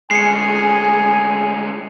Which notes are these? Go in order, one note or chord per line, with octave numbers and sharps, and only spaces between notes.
D2 G#3 G#4 G#5 C7 C#7